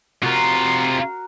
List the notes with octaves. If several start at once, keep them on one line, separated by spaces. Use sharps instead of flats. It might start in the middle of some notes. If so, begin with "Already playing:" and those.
C3 F4 F#4 A#4